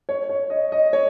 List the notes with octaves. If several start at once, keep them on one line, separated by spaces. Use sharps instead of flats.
C#5
C#5
D#5
D#5
C#5